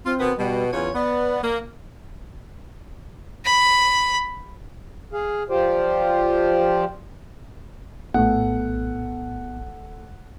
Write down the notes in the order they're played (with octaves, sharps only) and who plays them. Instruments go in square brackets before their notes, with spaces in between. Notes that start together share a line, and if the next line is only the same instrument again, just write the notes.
[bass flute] C4 [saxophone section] F4
[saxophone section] B2 D#3 B3
[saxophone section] B2 [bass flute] G3
[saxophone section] E2 C#4 C#5 [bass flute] F4
[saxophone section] B3 [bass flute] D5
[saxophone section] A#3
[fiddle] B5
[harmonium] G#4 F5
F3 F4 G4 C5 D5
[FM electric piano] A#1 A2 [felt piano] A3 [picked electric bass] B3 [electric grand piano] F#5